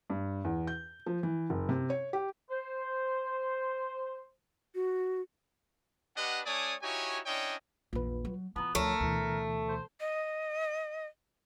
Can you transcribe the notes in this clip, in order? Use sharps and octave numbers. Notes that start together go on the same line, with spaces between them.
G2
E2
G6
F3
E3
F#1
C3
C#5
G4
C5
F#4
D4 G4 B4 D#5 F#5
A3 D4 C#5 D5 G#5 D#6
D#4 E4 F#4 G4 C#5 G#5
C#4 D4 E4 C#5 D#5 G5
A#1 E2 F4 B4
F#3
E3 B3 F4 A5 A#5
D2 F3 A3 A#4 C#5
D2 B2 E3
C5
D#5